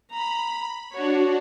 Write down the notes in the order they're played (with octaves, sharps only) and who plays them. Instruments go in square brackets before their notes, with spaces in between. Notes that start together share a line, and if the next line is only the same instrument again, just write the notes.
[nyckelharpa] A#5 [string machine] B5
[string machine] D4 F#4 [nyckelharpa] C#5